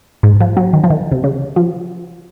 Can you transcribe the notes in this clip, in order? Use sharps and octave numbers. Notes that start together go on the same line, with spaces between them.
G#2
F3
F#3
D#3
F3
D#3
C3
C#3
F3